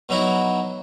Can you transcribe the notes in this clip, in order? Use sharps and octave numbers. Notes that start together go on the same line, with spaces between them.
B2 F#3 D#4 E4 F#4